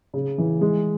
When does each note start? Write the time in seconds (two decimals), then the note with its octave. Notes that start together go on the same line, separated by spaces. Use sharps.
0.14 C#3
0.38 E3
0.61 G#3